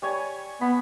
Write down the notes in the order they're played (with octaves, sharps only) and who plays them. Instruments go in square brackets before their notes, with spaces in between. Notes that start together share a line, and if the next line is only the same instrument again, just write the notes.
[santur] G3 C#5 G#5
[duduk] B3 [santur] B5